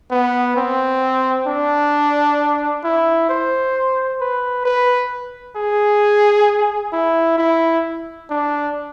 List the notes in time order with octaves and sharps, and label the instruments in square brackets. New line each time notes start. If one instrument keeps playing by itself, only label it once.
[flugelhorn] B3
C4
D4
E4
C5
B4
B4
G#4
E4
E4
D4